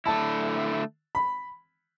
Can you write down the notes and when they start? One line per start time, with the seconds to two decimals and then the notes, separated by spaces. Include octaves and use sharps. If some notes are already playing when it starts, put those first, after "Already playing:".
0.06 D3 A3 E4 A5
1.15 B5